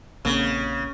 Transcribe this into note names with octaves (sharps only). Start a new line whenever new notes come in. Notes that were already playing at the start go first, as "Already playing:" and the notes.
A#1 C#3 A#3 C4